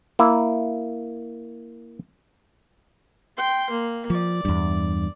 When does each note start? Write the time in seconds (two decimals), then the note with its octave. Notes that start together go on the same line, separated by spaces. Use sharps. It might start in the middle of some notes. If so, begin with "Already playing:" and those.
0.19 A#3 E4
3.37 G5 C6
3.70 A#3
4.10 F3 D5
4.45 E2 G2